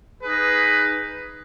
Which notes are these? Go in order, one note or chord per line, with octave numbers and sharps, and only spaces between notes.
D#4 G#4 B4